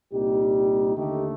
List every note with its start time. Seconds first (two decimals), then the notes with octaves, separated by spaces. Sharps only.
0.12 C2 A#2 G3 D#4 G4
0.96 D#2 D3 A3 D#4 G4